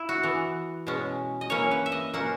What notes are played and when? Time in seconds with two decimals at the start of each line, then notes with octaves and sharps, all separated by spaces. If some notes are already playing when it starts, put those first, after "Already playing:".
Already playing: E4
0.09 F#4
0.23 E3 B3
0.87 B2 G#3 C#4
1.41 D#5
1.50 E3 A#3 C#4 C#5
1.71 B4
1.86 E5
1.92 D#5
2.14 B2 A#3 C#4 F#5